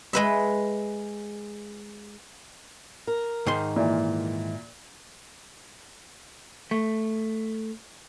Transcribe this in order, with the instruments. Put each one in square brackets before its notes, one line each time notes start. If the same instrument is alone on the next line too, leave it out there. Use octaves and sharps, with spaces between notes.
[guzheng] G#3 B4 E5
[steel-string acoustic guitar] A#4
[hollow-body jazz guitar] G#2 D#3 C6
[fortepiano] A#2 [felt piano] E3
[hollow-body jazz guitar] A3